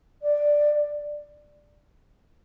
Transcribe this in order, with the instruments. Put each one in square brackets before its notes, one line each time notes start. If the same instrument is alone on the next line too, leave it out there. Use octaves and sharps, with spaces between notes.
[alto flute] D5